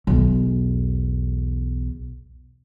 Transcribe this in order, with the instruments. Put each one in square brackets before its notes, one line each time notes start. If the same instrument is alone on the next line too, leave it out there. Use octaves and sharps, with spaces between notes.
[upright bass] B1 E2